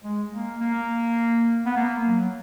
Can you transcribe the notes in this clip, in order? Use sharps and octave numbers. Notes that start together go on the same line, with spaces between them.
G#3
A#3
A#3
B3
A#3
F#3